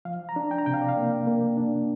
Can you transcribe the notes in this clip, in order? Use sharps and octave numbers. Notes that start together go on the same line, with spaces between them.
F3 F5
A#5
D4
G5
A#5
C3 G5
F5
D5
F5
A#3
A#3
D4